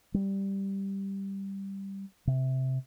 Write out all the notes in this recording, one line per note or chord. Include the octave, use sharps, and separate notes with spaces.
G3
C3